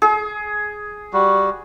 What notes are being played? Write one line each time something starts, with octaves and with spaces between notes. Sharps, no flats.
G#4
G3 F#4